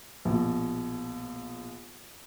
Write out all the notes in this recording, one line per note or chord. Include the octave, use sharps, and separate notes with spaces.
A#1 B2